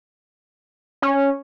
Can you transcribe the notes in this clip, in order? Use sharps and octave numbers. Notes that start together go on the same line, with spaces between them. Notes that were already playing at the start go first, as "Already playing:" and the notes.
C#4